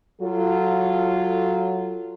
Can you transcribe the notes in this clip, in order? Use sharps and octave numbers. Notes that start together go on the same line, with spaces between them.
F#3 F4 A4